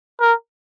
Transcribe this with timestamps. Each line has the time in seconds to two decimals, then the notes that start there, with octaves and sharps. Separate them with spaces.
0.21 A#4